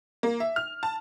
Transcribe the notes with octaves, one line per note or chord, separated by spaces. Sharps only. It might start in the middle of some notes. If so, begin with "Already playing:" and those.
A#3
E5
F6
A5